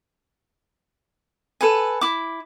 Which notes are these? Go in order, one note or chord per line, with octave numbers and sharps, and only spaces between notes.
A4 B4 G#5
E4 D6